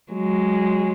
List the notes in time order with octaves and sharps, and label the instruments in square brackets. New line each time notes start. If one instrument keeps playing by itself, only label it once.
[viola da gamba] F#3 G#3